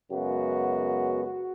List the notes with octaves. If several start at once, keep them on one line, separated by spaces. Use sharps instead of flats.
F#2 C#3 G#3 B3 F#4
F#4